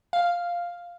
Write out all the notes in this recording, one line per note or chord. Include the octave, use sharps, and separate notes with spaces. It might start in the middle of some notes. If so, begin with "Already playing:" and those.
F5